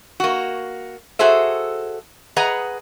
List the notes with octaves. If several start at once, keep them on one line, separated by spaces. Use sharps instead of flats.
A#3 F#4
F#4 G#4 A4 C5 E5
G#4 B4 D#5 F#5 A#5